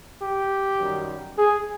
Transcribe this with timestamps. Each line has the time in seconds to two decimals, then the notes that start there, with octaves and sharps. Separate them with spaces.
0.21 G4
0.78 F#2 D#3 G3
1.37 G#4